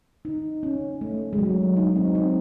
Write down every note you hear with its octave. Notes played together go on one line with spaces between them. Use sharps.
D#4
C#4
A3
G#3
F#3
D#4
C4
D#4